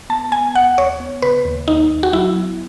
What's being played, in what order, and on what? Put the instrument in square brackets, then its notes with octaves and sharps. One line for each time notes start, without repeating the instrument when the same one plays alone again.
[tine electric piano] B3 [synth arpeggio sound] A5
[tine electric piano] B3 [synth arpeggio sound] G#5
[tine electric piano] D#2 [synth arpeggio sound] F#5
[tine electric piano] D#2 [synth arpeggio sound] C#5
[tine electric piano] B3
[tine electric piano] C#3 [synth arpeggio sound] B4
[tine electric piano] D#2
[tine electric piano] D#2 [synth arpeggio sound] D#4
[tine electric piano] D#2
[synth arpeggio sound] F#4
[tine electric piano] F#3 [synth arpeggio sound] E4
[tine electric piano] B3